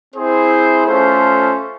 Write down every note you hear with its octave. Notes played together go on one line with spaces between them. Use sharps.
C4 E4 G#4 C5
A3 C#4 F4 A4 C5